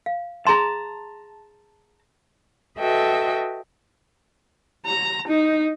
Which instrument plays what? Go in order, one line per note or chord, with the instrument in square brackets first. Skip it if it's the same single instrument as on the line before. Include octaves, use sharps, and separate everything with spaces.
[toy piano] F5
[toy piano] G#4 C6 [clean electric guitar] A5 A#5
[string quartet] F#4 A4 B4 D#5 E5 G5
[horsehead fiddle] A#5
D#4